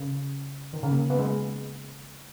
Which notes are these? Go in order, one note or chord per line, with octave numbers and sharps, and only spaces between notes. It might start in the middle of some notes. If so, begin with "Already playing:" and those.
Already playing: C#3
D#3
C#3
A#3
B3
G#3